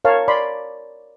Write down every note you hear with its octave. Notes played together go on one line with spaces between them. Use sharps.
A#4 C#5 F5 A5
D5 B5 C6